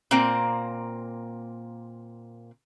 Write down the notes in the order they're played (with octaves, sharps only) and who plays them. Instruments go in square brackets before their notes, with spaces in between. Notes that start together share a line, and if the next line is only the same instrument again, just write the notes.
[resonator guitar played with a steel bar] A#2 A#3 C4